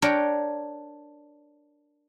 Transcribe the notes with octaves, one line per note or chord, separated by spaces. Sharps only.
D4 A#4 C#5 G5